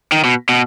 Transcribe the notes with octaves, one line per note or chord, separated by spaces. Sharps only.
D#3
B2
B2